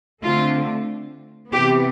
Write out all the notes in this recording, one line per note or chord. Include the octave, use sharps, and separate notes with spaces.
D3 A3 C4 F4
C3 E3 B3 G4